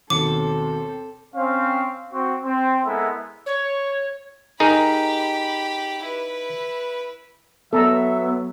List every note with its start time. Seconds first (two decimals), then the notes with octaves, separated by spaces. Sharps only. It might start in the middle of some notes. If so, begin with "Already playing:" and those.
0.10 D#2 B2 C4 A4 D6 C#7
1.35 C4 C#4 F5
2.12 C4 F#4
2.44 C4
2.85 G#3 B3 E4 A4 A#4 E5
3.46 C#5
4.60 D#4 G4 G#4 A#4 B5
6.03 E4 B4
7.73 F#3 B3 A4 E5 A#5 E6